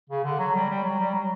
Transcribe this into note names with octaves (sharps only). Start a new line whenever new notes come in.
C#3
D3
F#3
G3
G3
F#3
G3
F#3